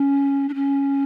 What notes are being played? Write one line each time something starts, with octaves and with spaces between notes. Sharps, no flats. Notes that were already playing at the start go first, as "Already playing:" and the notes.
Already playing: C#4
D4
C#4